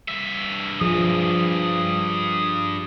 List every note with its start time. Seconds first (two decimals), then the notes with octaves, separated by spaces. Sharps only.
0.09 G2 E5
0.81 F3 G#4 D#6